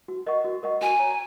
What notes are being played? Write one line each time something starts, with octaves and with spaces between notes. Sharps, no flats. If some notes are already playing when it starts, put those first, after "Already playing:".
F#4
A#4 D#5 F#5 C#6
F#4
A#4 D#5 F#5 C#6
F#4 G#5
C#5 A#5